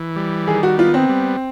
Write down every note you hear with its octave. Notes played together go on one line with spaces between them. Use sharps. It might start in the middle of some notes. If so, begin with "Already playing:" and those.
Already playing: E3
G3
D#3 G#4
F#4
B3 F4
C4
G3